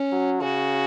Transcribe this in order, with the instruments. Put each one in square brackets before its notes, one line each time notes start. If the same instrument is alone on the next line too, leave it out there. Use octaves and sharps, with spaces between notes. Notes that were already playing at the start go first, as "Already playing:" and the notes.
Already playing: [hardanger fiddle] C#4
[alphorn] F#3
[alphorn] C#3 [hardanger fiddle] F#4